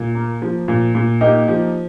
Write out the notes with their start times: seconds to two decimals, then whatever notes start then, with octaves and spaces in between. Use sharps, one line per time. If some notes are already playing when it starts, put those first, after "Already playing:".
Already playing: A#2
0.15 A#3
0.42 F3
0.68 A#2
0.95 A#2
1.21 A#3 D#4 G4
1.48 F3